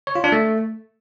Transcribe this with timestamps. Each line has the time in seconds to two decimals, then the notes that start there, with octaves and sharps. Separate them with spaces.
0.07 C#5
0.15 F4
0.24 D4
0.32 A3